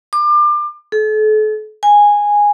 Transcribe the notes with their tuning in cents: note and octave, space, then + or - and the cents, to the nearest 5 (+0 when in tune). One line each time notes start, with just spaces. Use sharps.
D6 +30
A4 -40
G#5 -10